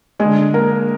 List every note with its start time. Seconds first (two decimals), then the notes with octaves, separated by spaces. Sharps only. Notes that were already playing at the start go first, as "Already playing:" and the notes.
0.20 D3 G#3 G#4
0.54 A#3 A#4